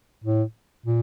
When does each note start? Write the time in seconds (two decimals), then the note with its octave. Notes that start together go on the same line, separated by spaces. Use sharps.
0.24 A2
0.86 A#2